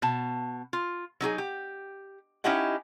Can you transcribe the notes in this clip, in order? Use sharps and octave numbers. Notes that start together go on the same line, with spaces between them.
B2 A5
F4
F#3 D#4 G4 G#4
G4
C#4 D#4 E4 G4 D#5 F#5